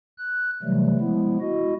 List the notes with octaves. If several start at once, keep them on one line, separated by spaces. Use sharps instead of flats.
F#6
C3 E3 F#3 G3 A3
F3 G#3 B3 E4
E4 F#4 D#5